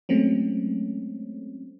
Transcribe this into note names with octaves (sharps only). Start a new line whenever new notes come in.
F#3 G#3 A3 C4 C#4